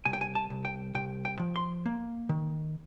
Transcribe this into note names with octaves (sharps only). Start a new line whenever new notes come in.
C2 G#5
G5
G#5
A5
C2
G5
C2 G5
G5
F3
C6
A#3
D#3